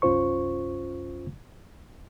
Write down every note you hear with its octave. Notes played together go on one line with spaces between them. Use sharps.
C2 F#2 C#4 F4 C5 C#6